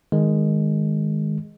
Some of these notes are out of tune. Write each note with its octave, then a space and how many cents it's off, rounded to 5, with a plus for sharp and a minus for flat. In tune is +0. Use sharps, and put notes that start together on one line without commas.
D#3 +0 G#3 +0